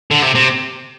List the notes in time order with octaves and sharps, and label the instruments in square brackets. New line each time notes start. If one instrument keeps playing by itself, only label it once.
[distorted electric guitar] D3
C3
C3